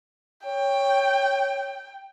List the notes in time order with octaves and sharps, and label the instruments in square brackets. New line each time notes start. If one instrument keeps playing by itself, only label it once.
[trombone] C#5 [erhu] G5